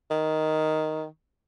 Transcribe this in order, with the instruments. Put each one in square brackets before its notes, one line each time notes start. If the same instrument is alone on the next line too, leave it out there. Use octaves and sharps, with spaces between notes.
[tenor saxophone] D#3